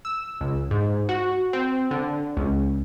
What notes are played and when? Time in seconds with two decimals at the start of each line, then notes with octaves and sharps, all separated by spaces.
0.05 E6
0.41 C#2
0.71 G#2
1.09 F#4
1.53 C4
1.91 D3
2.37 C#2